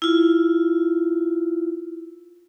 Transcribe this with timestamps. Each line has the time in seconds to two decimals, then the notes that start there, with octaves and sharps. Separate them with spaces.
0.02 E4 F4